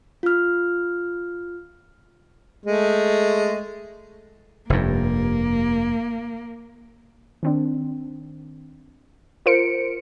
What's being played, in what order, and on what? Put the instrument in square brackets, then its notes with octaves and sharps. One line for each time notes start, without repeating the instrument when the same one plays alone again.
[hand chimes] F4 F6
[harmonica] G#3 A3
[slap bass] F1 G2 [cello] A#3
[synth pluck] D#3 C4 D4
F4 A#4 C5 C#7 D7